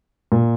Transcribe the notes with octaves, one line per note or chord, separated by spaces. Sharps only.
A#2